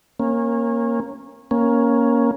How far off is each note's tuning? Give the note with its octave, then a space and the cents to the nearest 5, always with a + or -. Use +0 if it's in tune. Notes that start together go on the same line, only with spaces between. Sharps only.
A#3 +0 C#4 -25
A#3 +10 C#4 +0